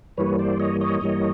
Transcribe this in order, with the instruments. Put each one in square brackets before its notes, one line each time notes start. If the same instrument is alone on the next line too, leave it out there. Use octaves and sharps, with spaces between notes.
[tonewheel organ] G2 E3 G3 A#3 B4 C#5
C5 D5
C#5 D#5
C#5 D#5
G2 E3 G3 A#3